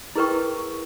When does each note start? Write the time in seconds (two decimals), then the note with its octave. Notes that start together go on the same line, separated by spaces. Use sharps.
0.15 E4 G#4 A#4 B4 G5 C#6